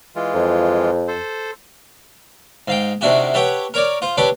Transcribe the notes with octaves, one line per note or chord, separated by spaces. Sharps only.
E3 G#3 F4
F2
A4 C5
G#2 F5 G5
C3 D#3 D4 E4 F#4 G4
G4 A4 B4 C#5 F#5 G5
A#4 C#5 D5
F4 C5
D4 G4 A4 B4 C#5 D5